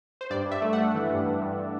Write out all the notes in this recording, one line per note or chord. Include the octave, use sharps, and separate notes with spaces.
C5
G2 D5
G2
E5
A3
F#5
A3
E3
G2
G2
G2